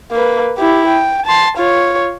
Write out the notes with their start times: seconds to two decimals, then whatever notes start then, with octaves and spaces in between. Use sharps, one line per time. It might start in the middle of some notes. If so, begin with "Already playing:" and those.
0.11 A#3 B4
0.58 E4 G4
0.87 G5
1.26 A5 C6
1.57 F4 C#5